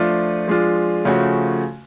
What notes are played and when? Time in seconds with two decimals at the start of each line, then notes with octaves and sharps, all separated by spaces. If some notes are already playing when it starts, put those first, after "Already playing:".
Already playing: F3 A3 D4 F4
0.48 F3 G#3 D4 F4
1.05 C#3 F3 A3 C#4 F#4